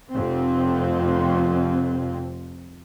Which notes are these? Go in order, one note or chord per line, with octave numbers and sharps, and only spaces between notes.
F1 F2 C4